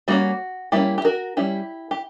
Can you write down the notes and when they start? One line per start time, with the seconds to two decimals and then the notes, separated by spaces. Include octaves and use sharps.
0.08 G3 A#3 C#4 F#4
0.72 G3 A#3 C#4 E4 G4
0.98 G4
1.05 F#4 A#4
1.37 G3 C#4 E4 G4
1.91 G4